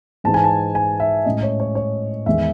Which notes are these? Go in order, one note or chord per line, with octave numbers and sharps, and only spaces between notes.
G#2 E3 G#3 A5
G#5
A5
G#5
E5
A2 G#3 C#4 D#5
C#5
C#5
C#5
E2 D#3 G#3 B3 E5